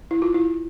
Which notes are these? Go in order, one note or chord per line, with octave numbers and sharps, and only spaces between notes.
E4
F4
E4